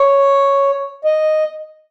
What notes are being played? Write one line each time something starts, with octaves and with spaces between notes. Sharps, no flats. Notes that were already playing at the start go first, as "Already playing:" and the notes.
Already playing: C#5
D#5